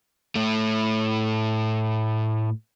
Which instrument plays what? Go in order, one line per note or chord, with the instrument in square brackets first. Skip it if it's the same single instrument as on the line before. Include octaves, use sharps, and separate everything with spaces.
[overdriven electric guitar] A2 A3